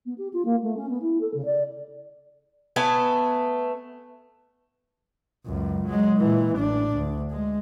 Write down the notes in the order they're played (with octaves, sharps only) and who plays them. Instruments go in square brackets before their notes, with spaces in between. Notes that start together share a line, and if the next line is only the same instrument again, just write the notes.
[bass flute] B3
G4
F4
A#3
A3
C#4
B3
E4
A4
C#3
D5
[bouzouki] A3 B3 G#5 A5
[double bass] C#2 F#2
F#3 G#3
A#2 E3
A1 D4
D2
G#3